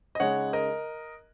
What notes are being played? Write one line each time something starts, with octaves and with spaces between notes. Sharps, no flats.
D#5
C#3 G#3 D#4 C#5 F#5
A#4 D#5